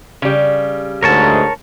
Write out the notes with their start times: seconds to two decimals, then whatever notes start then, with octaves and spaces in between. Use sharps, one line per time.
0.22 C#3 G3
1.03 D2 G#2 A#4 C#5 A5